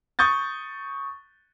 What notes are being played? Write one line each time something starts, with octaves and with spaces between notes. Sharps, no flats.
C#6 D#6 G6 A6